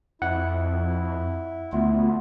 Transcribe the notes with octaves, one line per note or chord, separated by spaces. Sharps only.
F2 E4 F#5
D2 A3 B3 F4